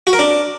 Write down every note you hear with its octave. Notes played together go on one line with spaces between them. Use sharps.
F#4
A#4
D4